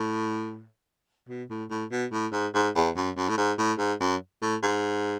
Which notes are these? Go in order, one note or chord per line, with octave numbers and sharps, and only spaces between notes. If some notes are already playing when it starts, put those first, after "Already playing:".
Already playing: A2
B2
A2
A2
B2
A2
G#2
G#2
E2
F#2
F#2
A2
G#2
A2
G#2
F#2
A2
G#2